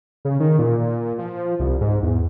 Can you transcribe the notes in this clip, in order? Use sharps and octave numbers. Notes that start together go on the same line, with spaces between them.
C#3
D#3
A#2
F3
C2
G#2
E2